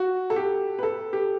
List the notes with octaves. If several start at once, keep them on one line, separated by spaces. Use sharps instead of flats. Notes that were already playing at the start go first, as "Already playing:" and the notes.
Already playing: F#4
A4
G4
B4
A4
G4